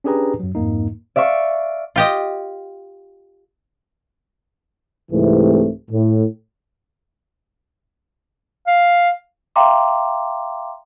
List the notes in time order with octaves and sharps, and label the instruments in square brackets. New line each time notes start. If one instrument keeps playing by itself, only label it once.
[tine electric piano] C#4 D4 G4 G#4 B4 A#5
F#2 F#3
F2 G#2 A#3 D#4
[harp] D5 E5 F5 C#6
[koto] F4 G4 D#5
[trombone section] C2 G#2 C3 E3 A3
A2
[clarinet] F5
[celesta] E5 F5 G5 A#5 C6 D6